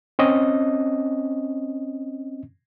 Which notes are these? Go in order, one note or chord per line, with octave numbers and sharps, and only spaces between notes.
C4 C#4 D#5